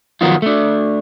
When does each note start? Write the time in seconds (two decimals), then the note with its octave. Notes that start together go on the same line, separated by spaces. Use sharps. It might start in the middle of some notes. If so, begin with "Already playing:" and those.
0.21 D#3 F3 F#3 B3 D#4 F4
0.42 A3 D4